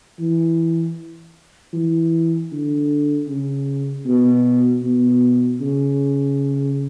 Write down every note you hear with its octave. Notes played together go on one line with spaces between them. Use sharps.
E3
E3
D3
C#3
B2
B2
C#3